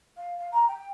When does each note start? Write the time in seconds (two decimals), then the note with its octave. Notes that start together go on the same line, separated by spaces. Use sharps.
0.17 F5
0.38 F5
0.52 A#5
0.68 G5